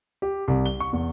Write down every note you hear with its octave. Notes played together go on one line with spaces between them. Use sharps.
G4
C2
G7
C#6
E2